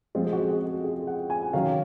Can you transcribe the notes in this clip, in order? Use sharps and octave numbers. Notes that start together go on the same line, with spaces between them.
F3 G#3 C4 F4
G#4
F#4
G#4
F#4
G#4
F#5
G#5
D#3 F#3 C#4 F5